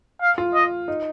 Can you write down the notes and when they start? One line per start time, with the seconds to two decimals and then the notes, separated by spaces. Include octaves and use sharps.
0.21 F5
0.38 F4
0.54 D#5
0.88 D#4